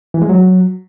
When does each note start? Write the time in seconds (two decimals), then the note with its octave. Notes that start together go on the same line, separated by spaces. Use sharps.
0.14 E3
0.22 G#3
0.29 F#3